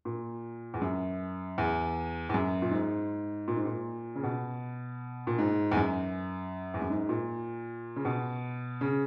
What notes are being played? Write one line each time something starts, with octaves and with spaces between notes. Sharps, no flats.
A#2
E2
F#2
E2
E2
F#2
A#2
G#2
A#2
G#2
A#2
C#3
B2
A#2
G#2
E2
F#2
E2
F#2
G#2
A#2
C#3
B2
C#3